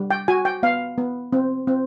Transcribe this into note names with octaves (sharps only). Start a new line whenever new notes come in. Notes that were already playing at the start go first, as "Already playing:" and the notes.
Already playing: G3
G5
F#4 G#5
G5
B3 F5
B3
C4
C4